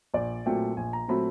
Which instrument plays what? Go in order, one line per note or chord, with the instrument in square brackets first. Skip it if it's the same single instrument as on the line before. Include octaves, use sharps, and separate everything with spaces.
[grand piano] A#1 D5
A#2 F#3 A3 C4 G5
A#1 G#5
A#5
A#2 F#3 A3 C4 B5